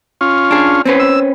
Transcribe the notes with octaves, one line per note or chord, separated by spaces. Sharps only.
C#4 F4
D4 G#4
C4 C#4 B4
E6